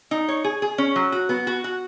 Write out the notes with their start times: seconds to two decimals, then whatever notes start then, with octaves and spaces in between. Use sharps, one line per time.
0.11 D#4
0.28 C#5
0.44 G#4
0.62 G#4
0.78 C#4
0.96 F#3
1.12 F#4
1.29 B3
1.47 F#4
1.64 F#4